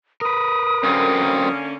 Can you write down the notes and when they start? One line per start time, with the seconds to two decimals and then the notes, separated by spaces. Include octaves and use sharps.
0.21 A#4 B4 D#6
0.84 F#2 D3 A#3 C4 C#4